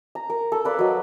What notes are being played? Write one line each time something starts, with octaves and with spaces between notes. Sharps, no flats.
A#5
A#4
A4
A#4 B4 D5 F5
F#3 D#5